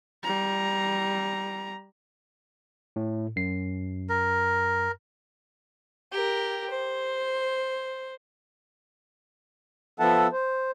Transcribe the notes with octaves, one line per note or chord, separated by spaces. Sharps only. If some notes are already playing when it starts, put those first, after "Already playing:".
G3 A#5
A2
F#2 C7
A#4
G4 A#4
C5
F3 B3 A4 E5 F#5 A5
C5